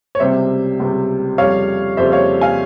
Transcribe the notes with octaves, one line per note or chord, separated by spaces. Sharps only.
C#5
C#2 C3 G3 C5 E5
C#2 C3 G3
F2 C#3 G3 C#5 F5
F2 C#3 G3 C5 E5
C#5 F5
F5 G#5